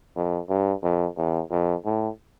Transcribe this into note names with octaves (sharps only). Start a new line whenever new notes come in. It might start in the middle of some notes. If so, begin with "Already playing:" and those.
F2
G2
F2
E2
F2
A2